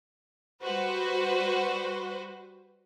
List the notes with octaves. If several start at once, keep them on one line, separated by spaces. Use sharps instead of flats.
G3 F#4 B4 C5